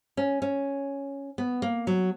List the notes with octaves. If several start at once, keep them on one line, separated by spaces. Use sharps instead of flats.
C#4
C#4
B3
A#3
F#3